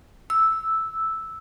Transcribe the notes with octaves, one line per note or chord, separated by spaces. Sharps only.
E6